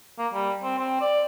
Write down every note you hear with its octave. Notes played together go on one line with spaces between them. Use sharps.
A#3
G3
C4
C4
D5